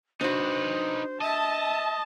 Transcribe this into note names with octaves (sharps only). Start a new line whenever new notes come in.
D4 D#4 F#4 B4 C5
D#5 E5 A5